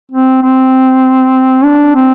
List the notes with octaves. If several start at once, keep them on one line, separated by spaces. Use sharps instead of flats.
C4
C4
D4
C4